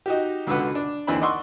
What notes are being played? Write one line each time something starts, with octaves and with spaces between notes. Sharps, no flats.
D#4 F#4 G4
C#2 B2 D3 B4 F#5
D4
D#2 D3 E3 C4 D4 B5
D5 D#5 F#5 C6 C#6 E6